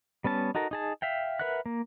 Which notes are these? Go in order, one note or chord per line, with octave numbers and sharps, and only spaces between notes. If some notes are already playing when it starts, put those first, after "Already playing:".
G3 B3 C#4 A5
D#4 F#4 A4 A#4
D#4 G#4 A5
E5 F5 G5
A#4 B4 E5 F#5 F#6
A#3